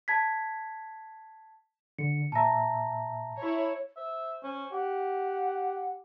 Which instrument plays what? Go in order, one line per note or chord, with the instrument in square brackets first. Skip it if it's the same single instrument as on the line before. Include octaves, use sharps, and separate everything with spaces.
[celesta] A5 G#6 B6
[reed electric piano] D3 [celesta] C#7
[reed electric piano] A#2 E5 [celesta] A5 A#5 A#6
[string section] E4 C#5
[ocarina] C5 [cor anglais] E5
[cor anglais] C#4
[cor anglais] G4 [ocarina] F#5